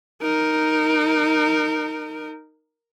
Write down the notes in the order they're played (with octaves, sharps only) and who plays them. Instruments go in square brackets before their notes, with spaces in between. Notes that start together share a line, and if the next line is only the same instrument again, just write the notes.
[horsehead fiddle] D#4 A#4